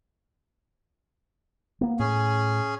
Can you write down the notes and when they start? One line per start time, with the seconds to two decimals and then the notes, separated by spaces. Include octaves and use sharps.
1.81 A#3 B3
1.99 A2 C#4 G#4